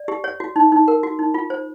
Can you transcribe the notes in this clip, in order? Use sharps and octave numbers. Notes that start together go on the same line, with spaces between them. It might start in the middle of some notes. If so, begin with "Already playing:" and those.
Already playing: D5
G4
C#5
F#4
D#4
D#4
A#4
F#4
D#4
F4
C5